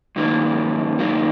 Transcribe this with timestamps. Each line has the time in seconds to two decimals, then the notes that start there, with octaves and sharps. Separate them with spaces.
0.16 G2 D#3 F#3 A#3
0.99 G2 D#3 F#3 A#3